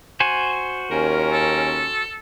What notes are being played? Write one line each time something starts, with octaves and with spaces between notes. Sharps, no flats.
F#4 C5 G#5
D#2 C#4 A#4
A4